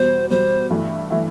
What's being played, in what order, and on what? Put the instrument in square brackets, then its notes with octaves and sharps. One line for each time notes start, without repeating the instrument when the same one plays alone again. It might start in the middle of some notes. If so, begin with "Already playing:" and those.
Already playing: [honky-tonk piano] E2 B2 G3 [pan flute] C5
[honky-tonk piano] E2 B2 G3 [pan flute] C5
[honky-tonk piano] G2 E3 A3 E4
E3 A3 E4